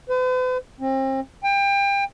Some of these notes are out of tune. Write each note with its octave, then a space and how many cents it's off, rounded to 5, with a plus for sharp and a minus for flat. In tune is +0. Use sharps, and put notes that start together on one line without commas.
B4 +45
C4 +35
G5 +30